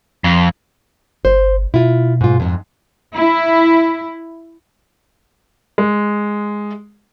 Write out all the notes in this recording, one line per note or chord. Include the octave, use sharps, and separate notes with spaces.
F2
G1 C5
B2 E4 F4
G#2 F4
F2 G#2
E4
G#3